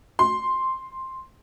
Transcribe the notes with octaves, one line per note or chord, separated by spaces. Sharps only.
C6